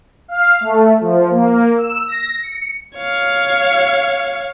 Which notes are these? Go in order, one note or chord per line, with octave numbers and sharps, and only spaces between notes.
F5
A3
F3
A#3
E6
A#6
C#7
C#5 F5